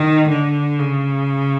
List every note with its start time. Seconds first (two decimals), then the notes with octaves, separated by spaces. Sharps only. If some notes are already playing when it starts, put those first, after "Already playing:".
Already playing: D#3
0.29 D3
0.80 C#3